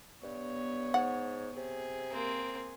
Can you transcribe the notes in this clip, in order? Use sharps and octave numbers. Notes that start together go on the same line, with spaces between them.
G2 B3 C#5
G#2 F#5
C3 G#4
A#3 C4